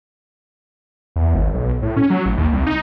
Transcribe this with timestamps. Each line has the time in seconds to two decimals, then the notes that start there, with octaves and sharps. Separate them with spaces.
1.16 E2
1.34 G#1
1.54 B1
1.82 A2
1.97 C#4
2.10 F#3
2.26 A1
2.37 D#2
2.52 C2
2.67 D#4